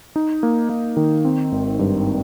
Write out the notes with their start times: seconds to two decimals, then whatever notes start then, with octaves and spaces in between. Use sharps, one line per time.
0.16 D#4
0.43 A#3
0.69 A#3
0.97 D#3
1.25 C4
1.52 G#1
1.79 G2